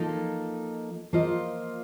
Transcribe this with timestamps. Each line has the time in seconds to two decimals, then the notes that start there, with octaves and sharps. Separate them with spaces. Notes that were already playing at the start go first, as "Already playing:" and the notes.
Already playing: F3 A#3 D#4 A4 D#5
1.13 F3 A#3 F4 C5 D#5